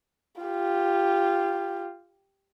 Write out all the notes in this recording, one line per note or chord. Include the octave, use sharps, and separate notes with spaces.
F4 G4